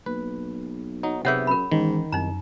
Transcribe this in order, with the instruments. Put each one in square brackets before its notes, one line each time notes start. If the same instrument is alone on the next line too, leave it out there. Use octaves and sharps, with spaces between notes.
[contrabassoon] B1 [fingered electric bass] A#3 [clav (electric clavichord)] B4
[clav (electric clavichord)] F#3 D#4
[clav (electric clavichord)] C3 B3 E5 [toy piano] G#4 C#5 F#5
[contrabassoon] F#2 [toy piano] A#4 B5
[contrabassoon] G#2 [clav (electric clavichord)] D#3 [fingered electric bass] E3 C#4
[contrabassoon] C2 [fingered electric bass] F#2 [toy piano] D#4 A#5